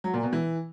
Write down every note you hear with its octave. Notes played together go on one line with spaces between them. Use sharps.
F#3
A#2
B2
E3